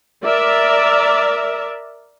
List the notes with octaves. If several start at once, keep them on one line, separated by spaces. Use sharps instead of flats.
A#4 D5 E5